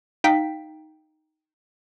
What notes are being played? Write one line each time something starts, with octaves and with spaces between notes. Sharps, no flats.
D#4 F5 G5 B6